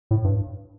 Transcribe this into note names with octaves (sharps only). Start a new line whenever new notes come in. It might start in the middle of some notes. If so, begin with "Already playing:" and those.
A2
G2